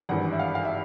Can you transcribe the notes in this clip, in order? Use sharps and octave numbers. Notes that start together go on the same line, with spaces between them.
G#1 G2 E3 F#5
E5
F5
F5
E5